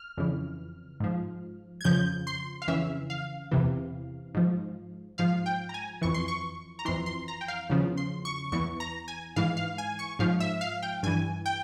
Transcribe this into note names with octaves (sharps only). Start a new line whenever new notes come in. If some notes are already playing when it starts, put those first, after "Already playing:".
Already playing: F6
F2 C#3 E3
G#2 F3
G#6
F2 C#3 F3 G6
C6
F5
F2 C#3 E3 E5
F5
E2 C3 E3
G#2 F3
G#2 F3 F5
G5
A#5
G#5
F2 E3 C#6
C6
C#6
A#5
F2 E3 C6
C6
A#5
G5
F5
E2 C#3 F3
C6
C#6
E2 E3 C#6
A#5
G#5
G#2 E3 F5
F5
G#5
C#6
G#2 F3 F5
E5
F5
G5
G2 E3 G#5
G5